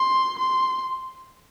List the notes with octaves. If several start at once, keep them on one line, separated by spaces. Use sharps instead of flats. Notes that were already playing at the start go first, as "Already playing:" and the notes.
Already playing: C6
C6